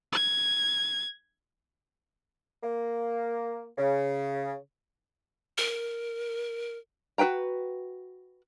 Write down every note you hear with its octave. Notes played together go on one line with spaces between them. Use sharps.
G#6
A#3
C#3
A#4
F#4 G#4 B4 G5 A#5